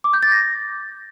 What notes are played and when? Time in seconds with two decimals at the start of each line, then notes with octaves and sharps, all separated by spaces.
0.04 D6
0.13 G6
0.23 A6
0.32 A#6